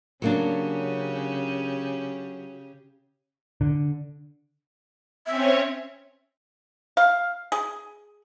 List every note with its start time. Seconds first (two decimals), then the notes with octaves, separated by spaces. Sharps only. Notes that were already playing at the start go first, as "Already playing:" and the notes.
0.22 C#3 F#3 A#3 C#4 D4 G4
3.61 D3
5.26 C4 C#4 C#5 E5
6.97 F5
7.52 G#4